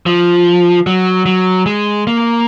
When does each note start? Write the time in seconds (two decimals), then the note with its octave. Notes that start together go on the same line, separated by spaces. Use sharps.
0.06 F3
0.87 F#3
1.26 F#3
1.66 G#3
2.07 A#3